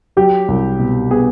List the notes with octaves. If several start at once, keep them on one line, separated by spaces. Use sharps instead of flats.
F#3 G4
C2
B2
B3 G#4